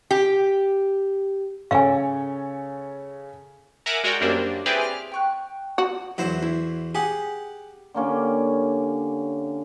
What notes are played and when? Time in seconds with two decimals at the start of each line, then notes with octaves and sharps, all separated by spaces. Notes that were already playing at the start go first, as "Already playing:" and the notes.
0.11 G4
1.71 C#3 A4 C#5 F5 G#5
3.86 A#4 E5 F#5 G#5 A#5 D6
4.04 G#3 F#4 A#4 D5 G5
4.21 F#2 G3 A#3 C4 D4
4.66 C4 E4 G4 G#4 B4 D5
4.81 F6
5.12 G5 C#6 F#6
5.78 F#4
6.18 E2 F#3 E4 F#4 C5
6.42 E4
6.95 G4 G#4 F#5
7.94 D3 A#3 C#4 G4